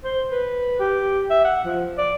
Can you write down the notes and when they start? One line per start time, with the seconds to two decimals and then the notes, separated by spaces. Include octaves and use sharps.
0.04 C5
0.32 B4
0.80 G4
1.30 E5
1.45 F#5
1.64 F3
1.98 D5